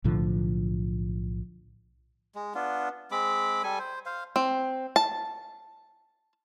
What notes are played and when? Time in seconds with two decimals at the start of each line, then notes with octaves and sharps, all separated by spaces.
0.04 B1 A2 D3 F3
2.35 G#3
2.55 B3 D4 F4
3.11 G#3 C4 B5 D6
3.63 G3 A4 G#5
3.79 C5
4.06 C5 F5
4.36 C4
4.96 A5